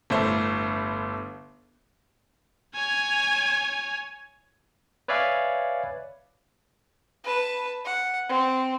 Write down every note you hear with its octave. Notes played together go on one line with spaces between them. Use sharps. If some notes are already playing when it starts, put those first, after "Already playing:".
G1 A2 A3 C5
C#5 G#5
B4 C#5 D5 E5 F5 G#5
B4 A5
F#5
C4